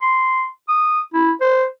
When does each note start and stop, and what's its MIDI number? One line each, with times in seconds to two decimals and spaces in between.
0.01 0.46 84
0.68 1.00 87
1.14 1.31 64
1.41 1.64 72